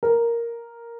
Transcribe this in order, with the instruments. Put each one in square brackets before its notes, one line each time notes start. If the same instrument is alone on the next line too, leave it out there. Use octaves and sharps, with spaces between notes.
[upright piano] A#4